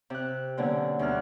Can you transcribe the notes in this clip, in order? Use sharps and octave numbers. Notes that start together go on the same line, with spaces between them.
C3 F#6
B2 D3 F#3 A#3 C#4
D2 B2 G3 D4 F6 F#6